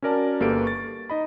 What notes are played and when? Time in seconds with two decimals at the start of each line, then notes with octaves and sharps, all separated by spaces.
0.02 C#4 F#4 A#4 D5 A5
0.40 G1 A#3 G4 A4 B4 D7
0.64 C#6 A6
1.10 D#4 D#5 B5